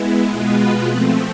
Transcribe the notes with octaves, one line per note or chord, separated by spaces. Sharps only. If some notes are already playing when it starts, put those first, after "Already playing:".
Already playing: G#3 B3 E4
B2 G#3 B3 F4 B4
F3 A3 C4